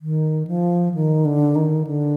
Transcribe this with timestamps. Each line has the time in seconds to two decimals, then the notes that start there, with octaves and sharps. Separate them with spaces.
0.01 D#3
0.47 F3
0.94 D#3
1.25 D3
1.55 D#3
1.87 D3